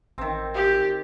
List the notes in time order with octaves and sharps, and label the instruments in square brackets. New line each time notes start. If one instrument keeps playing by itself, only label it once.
[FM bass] A1 [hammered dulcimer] D#3 C4
[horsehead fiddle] G4